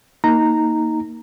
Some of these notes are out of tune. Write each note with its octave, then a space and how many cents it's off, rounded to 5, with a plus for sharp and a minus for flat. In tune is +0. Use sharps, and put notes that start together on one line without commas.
A#3 +0 D#4 +20 A#5 -10